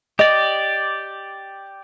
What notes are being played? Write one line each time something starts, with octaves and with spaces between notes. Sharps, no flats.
G4 D5 D#5